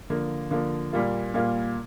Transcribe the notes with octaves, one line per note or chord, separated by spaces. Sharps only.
D3 F3 A#3
D3 F3 A#3
A#2 G3 A#3 F4
A#2 G3 A#3 F4